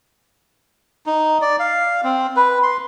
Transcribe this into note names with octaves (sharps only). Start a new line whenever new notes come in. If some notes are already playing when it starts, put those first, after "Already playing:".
D#4
D5
F5
C4
B4
C6